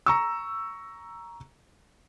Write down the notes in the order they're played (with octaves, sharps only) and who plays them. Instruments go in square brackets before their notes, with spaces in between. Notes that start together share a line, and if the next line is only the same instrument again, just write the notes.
[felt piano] A#5 C#6 E6